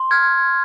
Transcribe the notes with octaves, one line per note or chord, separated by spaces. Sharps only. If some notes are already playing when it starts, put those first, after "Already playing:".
Already playing: C6
F6 G#6